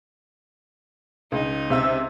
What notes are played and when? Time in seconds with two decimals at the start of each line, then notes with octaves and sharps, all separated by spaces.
1.32 C#2 D#4
1.70 C3 E5 E6